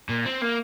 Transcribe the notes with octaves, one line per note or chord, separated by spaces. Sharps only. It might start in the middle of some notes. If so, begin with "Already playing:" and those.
A#2
C4
A#3